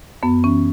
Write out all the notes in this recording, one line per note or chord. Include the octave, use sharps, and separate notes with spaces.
F#2 B3
E3 C#4